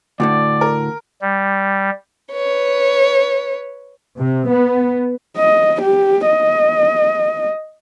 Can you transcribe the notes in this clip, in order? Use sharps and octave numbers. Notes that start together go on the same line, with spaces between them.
D2 A2 D3 D5
A#4
G3
B4 C#5
C3
B3
D#5
G4
D#5